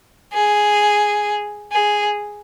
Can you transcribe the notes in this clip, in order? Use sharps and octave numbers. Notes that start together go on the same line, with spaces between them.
G#4
G#4